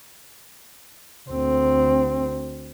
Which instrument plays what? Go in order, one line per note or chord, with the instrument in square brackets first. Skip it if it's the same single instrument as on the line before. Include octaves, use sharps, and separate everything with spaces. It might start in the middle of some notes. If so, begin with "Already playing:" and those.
[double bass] D2 C4